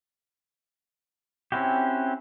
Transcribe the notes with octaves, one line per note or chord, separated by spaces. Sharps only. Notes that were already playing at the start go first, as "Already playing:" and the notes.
C4 C#4 E4 F#4 G4